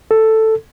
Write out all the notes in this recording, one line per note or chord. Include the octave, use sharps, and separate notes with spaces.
A4